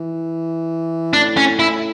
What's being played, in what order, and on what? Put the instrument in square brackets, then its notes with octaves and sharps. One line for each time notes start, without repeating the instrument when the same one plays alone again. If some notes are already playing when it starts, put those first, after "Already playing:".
Already playing: [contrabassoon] E3
[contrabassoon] A2 [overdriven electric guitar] D4
[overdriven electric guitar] C#4
E4